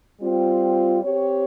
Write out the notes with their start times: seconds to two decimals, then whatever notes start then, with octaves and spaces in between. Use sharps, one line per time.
0.19 G3 C4 F4
1.02 C4 G4 C#5